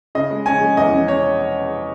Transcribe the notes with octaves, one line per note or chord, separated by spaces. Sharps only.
C#3 D#5
G#3
C#4 G#5
G#3
E2 D#5
C#4
C#4 C#5